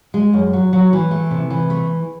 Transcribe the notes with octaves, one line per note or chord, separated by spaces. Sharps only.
G#3
F#2
F#3
F#3
E3
A3
C3
E3
A3